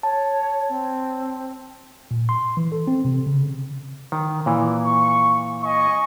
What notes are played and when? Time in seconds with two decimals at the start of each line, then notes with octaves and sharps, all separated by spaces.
0.03 C#5 A5
0.69 C4
2.11 A#2
2.29 C6
2.57 E3
2.72 A4
2.87 C4
3.05 C3
3.26 C#3
4.12 D#3
4.46 A#2 E3
4.85 C#6
5.63 D#5 G#5 C#6